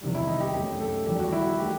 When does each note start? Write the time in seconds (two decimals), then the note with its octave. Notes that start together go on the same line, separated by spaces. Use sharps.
0.01 E2 C3 D#3 G3
0.15 E4
0.28 D#4
0.41 G4
0.54 F#2 F#3 A3 G4
0.80 A4
1.06 E2 D#3 G3 G4
1.19 F#4
1.32 E4
1.45 F#4
1.59 D#3 A3 G4